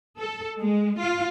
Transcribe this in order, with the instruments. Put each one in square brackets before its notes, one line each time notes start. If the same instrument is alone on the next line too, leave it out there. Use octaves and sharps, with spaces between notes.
[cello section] A4
G#3
F4